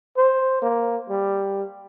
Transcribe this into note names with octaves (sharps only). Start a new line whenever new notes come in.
C5
A#3
G3